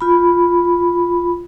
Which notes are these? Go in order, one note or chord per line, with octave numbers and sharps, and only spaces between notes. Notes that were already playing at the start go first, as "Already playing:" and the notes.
F4 B5